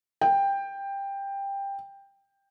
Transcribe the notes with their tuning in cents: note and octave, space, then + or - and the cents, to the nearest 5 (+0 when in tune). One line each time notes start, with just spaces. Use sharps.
G5 +15